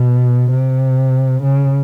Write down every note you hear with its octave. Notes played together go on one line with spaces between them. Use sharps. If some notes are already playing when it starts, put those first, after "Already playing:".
Already playing: B2
C3
C#3